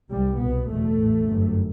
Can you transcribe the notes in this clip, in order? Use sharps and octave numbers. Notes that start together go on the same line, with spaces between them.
C2 C3 G3
C2 B2 B3
F#1 E2 B2 A3
A1 A2
G1 F#2